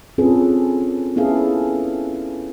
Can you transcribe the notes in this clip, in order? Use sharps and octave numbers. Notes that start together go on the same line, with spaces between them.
C4 C#4 F4 G#4 A4 B4
B3 C#4 E4 G#4 A4 F5